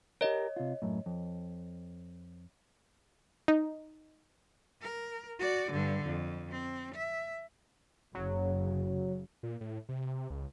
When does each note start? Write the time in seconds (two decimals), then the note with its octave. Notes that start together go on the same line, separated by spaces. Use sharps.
0.21 G4 A#4 C#5 D#5
0.56 C3 F4
0.82 F#2 A2
1.06 F2
3.48 D#4
4.82 A#4
5.39 F#4 D5
5.72 G2 D3
6.06 F2
6.51 C4
6.95 E5
8.15 F#1 C#3 F#3
9.43 A#2
9.61 A2
9.89 C3
10.30 C#2